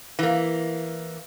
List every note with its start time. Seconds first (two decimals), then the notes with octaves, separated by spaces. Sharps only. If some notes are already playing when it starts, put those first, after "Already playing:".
0.19 E3 A#3